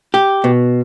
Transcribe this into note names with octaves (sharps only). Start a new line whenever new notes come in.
G4
B2